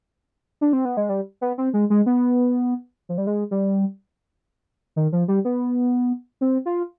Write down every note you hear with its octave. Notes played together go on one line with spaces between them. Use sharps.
D4
C4
B3
G#3
G3
B3
C4
G#3
G#3
B3
F3
G3
G#3
G3
D#3
F3
G3
B3
C4
F4